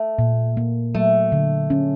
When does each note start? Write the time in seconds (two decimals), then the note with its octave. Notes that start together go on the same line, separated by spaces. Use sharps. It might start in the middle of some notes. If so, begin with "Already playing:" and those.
Already playing: A3
0.19 A#2
0.57 A#3
0.94 F#3 A3
1.32 D3
1.70 C#4